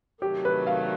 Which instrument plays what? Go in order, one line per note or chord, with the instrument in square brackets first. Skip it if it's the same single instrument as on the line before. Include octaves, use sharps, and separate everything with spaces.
[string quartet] C3 D#3 F#3 A3 [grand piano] G4
[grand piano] B4
F5